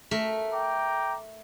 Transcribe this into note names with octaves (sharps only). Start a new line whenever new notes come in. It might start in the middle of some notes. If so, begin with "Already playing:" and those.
A3 A#4 E5
G5 A#5 D6